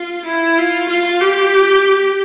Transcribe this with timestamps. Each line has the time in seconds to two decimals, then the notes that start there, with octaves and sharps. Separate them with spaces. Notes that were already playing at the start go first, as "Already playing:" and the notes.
Already playing: F4
0.26 E4
0.57 F4
0.89 F4
1.21 G4